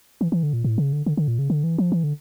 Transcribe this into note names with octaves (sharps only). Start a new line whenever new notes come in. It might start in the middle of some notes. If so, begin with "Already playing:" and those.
E3
E3
D3
A#2
A2
C#3
D3
D3
D3
A#2
C#3
D3
E3
F3
E3
D3